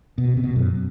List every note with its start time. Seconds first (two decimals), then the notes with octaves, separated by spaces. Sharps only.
0.18 B2
0.37 C3
0.44 B2
0.56 F#2